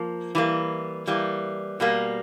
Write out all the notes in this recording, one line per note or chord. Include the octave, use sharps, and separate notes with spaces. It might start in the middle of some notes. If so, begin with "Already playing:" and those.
Already playing: F3 A#3
E3 G3 A#3
E3 G3 A#3
B2 G3 A#3